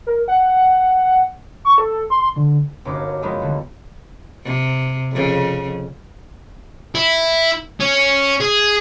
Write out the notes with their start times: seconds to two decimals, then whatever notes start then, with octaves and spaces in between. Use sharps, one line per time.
0.07 A#4
0.28 F#5
1.65 C#6
1.78 A4
2.10 C6
2.36 D3
2.85 G1 F#2 A#3 D#4 D6
3.22 F3 F#3 G#3 B3 D#4 E4
3.40 D2 D3 G3
4.43 C3
5.10 F2 C#3
6.95 E4
7.80 C#4
8.41 G#4